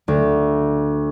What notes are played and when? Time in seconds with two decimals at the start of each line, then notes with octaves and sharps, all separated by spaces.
0.08 D2